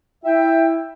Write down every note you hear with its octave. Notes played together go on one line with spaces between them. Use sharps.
E4 E5 G5